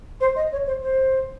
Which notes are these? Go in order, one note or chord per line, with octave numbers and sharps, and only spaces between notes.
C5
D#5
C#5
C5
C5